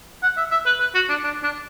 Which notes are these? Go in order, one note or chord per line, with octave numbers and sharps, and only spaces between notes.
F#5
E5
E5
B4
B4
F#4
D4
D4
D4